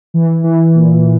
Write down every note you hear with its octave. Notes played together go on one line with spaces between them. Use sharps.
E3
E3
A#2